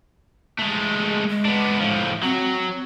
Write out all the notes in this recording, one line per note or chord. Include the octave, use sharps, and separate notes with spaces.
G#3 A3
G#3
B3 D4
A2 F3
F#3 C4